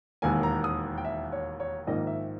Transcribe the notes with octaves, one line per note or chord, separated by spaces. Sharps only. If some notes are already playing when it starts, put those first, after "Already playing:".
E1 D#2 D#3 A#3 G#5
A#5
D#6
G5
E5
C#5
C#5
A#1 G#2 D#3 A#3 D#5
E5